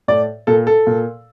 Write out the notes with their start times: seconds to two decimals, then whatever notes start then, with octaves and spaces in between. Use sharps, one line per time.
0.08 A2 D5
0.47 A#2 A4
0.67 A4
0.87 A#2